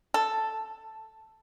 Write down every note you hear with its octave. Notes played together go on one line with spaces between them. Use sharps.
A4